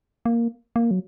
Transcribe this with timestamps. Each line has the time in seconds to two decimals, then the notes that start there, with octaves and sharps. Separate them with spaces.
0.26 A#3
0.76 A#3
0.91 F#3